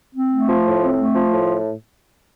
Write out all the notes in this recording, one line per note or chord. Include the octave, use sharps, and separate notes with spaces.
C4
A3
F3
A2
C4
A3
F3
A2